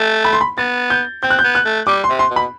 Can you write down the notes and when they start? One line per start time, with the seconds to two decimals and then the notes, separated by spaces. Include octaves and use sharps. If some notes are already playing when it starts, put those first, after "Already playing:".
Already playing: A3
0.25 B5
0.33 C6
0.41 B5
0.58 B3 A6
0.90 G6
1.23 C4 G6
1.30 F#6
1.39 G6
1.44 B3
1.55 F#6
1.65 A3
1.87 G3 D6
2.04 C6
2.09 C3
2.19 C6
2.31 B2
2.36 B5